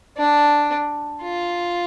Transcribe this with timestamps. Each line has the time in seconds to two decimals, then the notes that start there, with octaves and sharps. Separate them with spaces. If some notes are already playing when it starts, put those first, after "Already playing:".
0.18 D4
1.22 F4